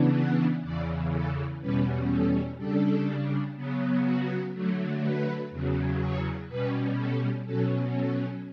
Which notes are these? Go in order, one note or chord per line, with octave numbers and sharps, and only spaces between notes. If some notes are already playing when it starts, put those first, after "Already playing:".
Already playing: C#3 E3 B3 D4
F#5
E2 C#3 E3 D5
A4
E2 B2 G3 C#4 B4
A4
C#3 G3 D4 A4
C#3 F#3 B3
F#4
D3 F#3 A3
B4
E2 C#3 F#3
C#5
B2 G3 C#4 B4
A4
B2 F#3 C#4 A4
A4